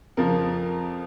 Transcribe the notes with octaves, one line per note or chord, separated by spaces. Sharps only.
F2 C#3 F3 A#4